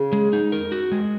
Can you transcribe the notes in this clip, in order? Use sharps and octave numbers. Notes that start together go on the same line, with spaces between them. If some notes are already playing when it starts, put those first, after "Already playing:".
Already playing: C#3
G#3
D#4
F2 A#4
F#4
F#2
F2 G#3